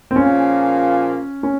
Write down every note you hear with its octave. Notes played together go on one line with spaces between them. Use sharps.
C4
A#2 F3 A#3 C#4 F4 G#4
C#4